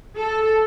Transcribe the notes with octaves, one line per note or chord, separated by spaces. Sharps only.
A4